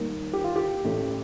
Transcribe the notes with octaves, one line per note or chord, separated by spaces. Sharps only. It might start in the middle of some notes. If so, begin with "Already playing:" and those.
Already playing: D#2 D#3 G3 A#3
G4
F4
G4
A1 A2 A3